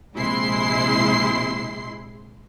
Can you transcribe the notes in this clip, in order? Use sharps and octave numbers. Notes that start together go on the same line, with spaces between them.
A#1 C3 G#3 E4 C6 C7